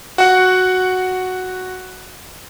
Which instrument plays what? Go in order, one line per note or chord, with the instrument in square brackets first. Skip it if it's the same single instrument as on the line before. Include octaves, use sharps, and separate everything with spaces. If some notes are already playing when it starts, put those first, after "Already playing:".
[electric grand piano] F#4 F#5